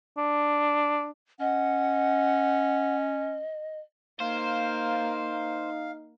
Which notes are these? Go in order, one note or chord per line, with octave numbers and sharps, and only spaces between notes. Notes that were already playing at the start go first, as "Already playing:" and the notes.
D4
C#4 D#5 F#5
A#3 D#4 C5 F5